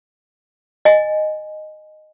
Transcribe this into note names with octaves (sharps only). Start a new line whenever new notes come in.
D#5 G#5